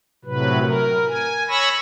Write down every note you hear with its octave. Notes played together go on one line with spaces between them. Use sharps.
A2 C3 F#3 B4
A#4
G#5
C#5 B5 C#6 E6 A#6